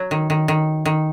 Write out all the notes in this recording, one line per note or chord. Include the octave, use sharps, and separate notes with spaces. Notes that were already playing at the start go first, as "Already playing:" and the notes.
Already playing: F#3
D#3
D#3
D#3
D#3